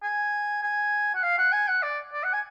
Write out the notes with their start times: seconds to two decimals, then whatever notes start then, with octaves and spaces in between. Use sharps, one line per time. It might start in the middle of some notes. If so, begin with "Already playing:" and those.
0.03 G#5
0.63 G#5
1.15 F#5
1.23 F5
1.38 F#5
1.53 G#5
1.68 F#5
1.83 D5
2.13 D5
2.24 F#5
2.33 G#5